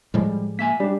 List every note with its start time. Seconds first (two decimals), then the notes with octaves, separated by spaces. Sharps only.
0.14 A2 F3 G3 G#3
0.59 A#3 E5 G#5 B6
0.80 G3 D4 G4